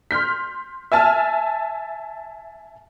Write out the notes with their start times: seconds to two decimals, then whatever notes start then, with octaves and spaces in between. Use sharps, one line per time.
0.11 C6 F6 G6 B6
0.92 E5 G#5 A5 F6